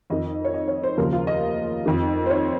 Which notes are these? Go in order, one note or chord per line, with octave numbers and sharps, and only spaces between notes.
F2 D#3 D#5
C#5
D#5
C#5
C5
D#2 C#3 F3 A#4
F4
D#5
F2 D#3
C5
C#5